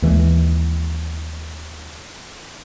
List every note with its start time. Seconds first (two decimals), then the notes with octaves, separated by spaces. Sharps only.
0.02 D#2 E3 F3 G#3